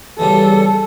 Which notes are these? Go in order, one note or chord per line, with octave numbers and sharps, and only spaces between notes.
E2 C#3 G3 A4